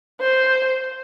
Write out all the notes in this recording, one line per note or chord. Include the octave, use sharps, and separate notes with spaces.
C5